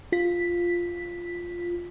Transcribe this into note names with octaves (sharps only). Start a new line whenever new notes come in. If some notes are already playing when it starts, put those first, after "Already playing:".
F4 B6